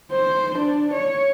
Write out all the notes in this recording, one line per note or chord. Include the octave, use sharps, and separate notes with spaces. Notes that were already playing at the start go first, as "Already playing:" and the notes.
C5
D4
C#5